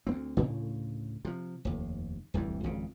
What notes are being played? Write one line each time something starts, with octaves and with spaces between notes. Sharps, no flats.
D2 B3 C4
D2 A2 C#3
C3 F3
F1 D#2
D1 C2 F2 E3
G#1 F2 C#3